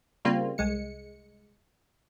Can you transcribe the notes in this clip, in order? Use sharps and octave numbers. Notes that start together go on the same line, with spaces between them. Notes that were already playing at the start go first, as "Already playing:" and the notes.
C#3 G3 A#3 C4 F4
C2 G#3 C#7